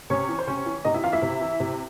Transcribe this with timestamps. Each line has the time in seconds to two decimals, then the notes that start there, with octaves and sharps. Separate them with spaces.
0.10 C3 C#4 C#5
0.29 E3
0.39 C5
0.47 C3 C#4 C#5
0.66 E3
0.85 C3 D#4 D#5
0.94 E4 E5
1.04 E3 F4 F5
1.13 E4 E5
1.22 C3
1.41 E3
1.60 C3